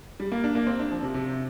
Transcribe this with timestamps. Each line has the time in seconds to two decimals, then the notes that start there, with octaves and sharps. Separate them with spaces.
0.20 G3
0.32 A#3
0.44 D4
0.55 A#3
0.67 C4
0.80 D4
0.91 F3
1.03 C3
1.14 C3